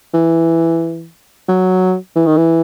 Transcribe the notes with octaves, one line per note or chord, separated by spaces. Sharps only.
E3
F#3
E3
D#3
E3